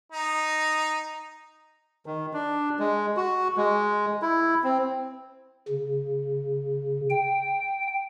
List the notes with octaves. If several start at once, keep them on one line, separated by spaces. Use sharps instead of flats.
D#4
D#3
D4
G#3
F#4
G#3
E4
C4
C#3
G5